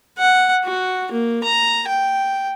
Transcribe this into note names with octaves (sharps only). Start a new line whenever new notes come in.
F#5
F#4
A#3
A#5
G5